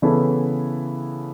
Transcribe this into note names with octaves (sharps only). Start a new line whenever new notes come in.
C#3 E3 B3 E4 A4